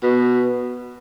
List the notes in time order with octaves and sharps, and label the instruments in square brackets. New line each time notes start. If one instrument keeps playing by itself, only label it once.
[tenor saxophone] B2